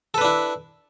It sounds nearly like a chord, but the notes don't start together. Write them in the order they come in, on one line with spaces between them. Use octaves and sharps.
A4 B4 D4 E4